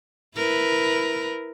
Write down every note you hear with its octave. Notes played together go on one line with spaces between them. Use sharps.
E4 A#4 B4